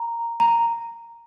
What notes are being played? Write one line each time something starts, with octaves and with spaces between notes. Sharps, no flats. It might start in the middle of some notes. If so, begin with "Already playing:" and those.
Already playing: A#5
A#5